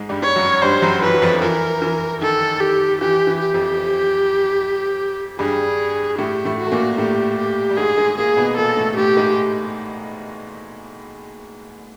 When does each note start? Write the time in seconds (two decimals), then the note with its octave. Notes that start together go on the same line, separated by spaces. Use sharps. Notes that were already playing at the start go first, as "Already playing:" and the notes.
Already playing: G#2 G#3
0.09 G2 G3
0.23 C#5
0.36 F#2 F#3
0.62 G2 G3 C5
0.82 F#2 F#3
1.02 E3 B4
1.13 F#3
1.22 F2 F3
1.42 E3 A#4
1.82 E3
2.21 D#3 A4
2.61 G4
3.01 E3 G4
3.27 E3
3.40 G4
3.54 F2 F3
5.39 G2 G3 G#4
6.18 A2 A3 G4
6.45 A2 A3
6.59 F#4
6.67 A3
6.72 A#2 A#3
6.98 A2 A3 G4
7.38 G4
7.70 G3
7.77 G#2 G#3 G#4
7.98 G#2 G#3
8.18 A#2 A#3 G#4
8.37 B2 B3
8.57 A#2 A#3 A4
8.77 A2 A3
8.97 A2 A3 G4
9.17 G#2 G#3